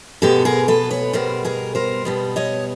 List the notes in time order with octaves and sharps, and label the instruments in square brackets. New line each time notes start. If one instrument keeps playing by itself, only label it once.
[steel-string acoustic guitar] B2 G#3 B3 G4 A4
G#4 A#4
A4 B4
B4 C#5
B2 G3 B3 A#4 C5
G#4 A#4
A#4 C5
B2 G3 B3
C#5 D#5